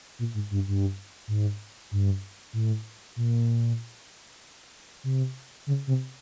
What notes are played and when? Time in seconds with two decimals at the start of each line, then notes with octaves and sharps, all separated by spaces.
0.19 A#2
0.34 G#2
0.51 G2
0.68 G2
1.28 G#2
1.91 G2
2.53 A2
3.16 A#2
5.04 C3
5.67 C#3
5.87 C3